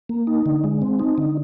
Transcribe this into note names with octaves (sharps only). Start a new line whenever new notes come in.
A#3
D#4
D3
G#3
C4
D#4
D3